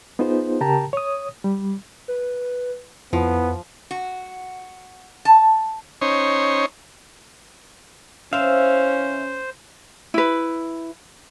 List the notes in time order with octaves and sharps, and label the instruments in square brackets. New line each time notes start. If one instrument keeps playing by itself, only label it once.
[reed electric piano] B3 D#4 F4 G#4 C5
C#3 G4 A#4 G5 A5 A#5
C#5 D#6
G3
[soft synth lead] B4
[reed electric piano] F2 [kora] F3 [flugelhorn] B3 [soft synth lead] E4
[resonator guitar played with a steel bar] F#4
A5
[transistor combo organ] C#4 D#4 C5 C#5
[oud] E3 C4 [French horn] C#4 [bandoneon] C5 [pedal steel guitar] E5 F5
[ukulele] E4 B4